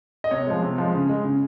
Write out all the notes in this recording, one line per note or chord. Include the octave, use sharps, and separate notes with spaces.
D#5
C3 C#5
F3 G#3
C3
F3 G#3
C#3
G#3
C#3